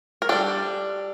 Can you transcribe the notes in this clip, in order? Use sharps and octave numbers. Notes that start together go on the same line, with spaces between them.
A#4
G3 D4 A4